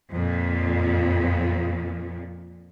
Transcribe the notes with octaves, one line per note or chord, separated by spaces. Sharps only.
F2 A#2